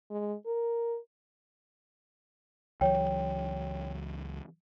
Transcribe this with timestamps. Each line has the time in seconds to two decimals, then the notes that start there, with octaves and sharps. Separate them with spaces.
0.11 G#3
0.46 A#4
2.81 C#2 E3 F#3 C#5 G5